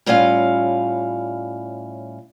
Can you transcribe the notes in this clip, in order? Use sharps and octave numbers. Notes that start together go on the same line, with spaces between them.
A2 G3 C#4 F4 F5